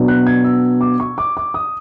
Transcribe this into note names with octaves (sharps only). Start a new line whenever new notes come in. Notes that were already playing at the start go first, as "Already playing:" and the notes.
Already playing: B2 F#3 B3 D4
F#6
G#6
E6
D6
C#6
D6
D6
D#6